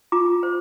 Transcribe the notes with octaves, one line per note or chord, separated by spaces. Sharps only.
F4 A#5 D6
C5